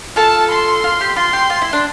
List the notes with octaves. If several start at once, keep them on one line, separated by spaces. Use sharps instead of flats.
F4 A4 A5
C6
F4
G4
F4 C6
G4
F4
E4
D4